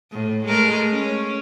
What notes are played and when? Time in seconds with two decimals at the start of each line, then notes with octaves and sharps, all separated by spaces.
0.12 A2
0.46 G#3 A3 A#4
0.92 C#4